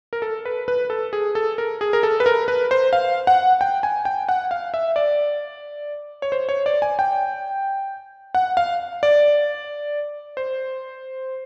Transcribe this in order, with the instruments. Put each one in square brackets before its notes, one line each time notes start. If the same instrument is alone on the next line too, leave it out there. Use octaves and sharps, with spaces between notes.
[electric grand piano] A#4
A4
B4
B4
A4
G#4
A4
A#4
G#4
A#4
A4
B4
A#4
B4
C5
F5
F#5
G5
G#5
G5
F#5
F5
E5
D5
C#5
C5
C#5
D5
G#5
G5
F#5
F5
D5
C5